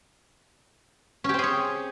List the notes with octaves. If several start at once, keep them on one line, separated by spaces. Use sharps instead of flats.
C4 C#4 G4 G#4 C#5